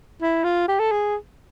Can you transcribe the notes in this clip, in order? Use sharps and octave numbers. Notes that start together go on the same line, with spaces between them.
E4
F4
G4
A4
G#4